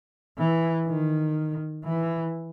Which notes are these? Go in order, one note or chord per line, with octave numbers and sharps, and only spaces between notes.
E3
D#3
E3